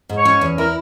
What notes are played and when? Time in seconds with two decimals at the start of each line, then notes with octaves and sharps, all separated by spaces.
0.09 G#2
0.17 C#5
0.25 C#4
0.41 E2
0.58 E4 A#4